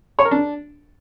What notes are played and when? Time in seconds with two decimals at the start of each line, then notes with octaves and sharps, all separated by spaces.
0.19 C#5
0.25 A#4
0.31 D4